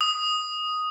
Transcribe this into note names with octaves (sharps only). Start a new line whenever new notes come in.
D#6